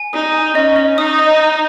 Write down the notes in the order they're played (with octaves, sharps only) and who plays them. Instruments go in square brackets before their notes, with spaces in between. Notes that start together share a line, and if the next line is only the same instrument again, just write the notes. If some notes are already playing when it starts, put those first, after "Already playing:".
Already playing: [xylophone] G#5
[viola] D#4 [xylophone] D#6
[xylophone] G#5
[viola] C#4 [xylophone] D#5
[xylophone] D#5
[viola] D#4 [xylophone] D#6
[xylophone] D#5
D#5